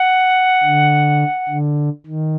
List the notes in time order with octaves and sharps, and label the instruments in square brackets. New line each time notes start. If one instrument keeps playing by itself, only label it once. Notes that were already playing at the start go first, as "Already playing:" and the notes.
Already playing: [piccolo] F#5
[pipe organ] D3
D3
D#3